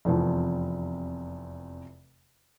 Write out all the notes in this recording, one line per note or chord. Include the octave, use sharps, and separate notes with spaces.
F1 E2 C3 F3